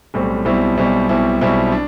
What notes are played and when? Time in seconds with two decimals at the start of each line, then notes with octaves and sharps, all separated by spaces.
0.14 B1 A2 G3 C4
0.45 B1 B2 G3 C4 E4
0.76 B1 B2 G3 C4 E4
1.09 B1 B2 G3 C4 E4
1.41 B1 B2 G3 C4 E4
1.72 D4